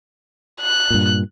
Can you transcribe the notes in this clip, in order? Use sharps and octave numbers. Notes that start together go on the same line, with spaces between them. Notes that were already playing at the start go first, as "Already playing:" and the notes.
F#6
G2 A#2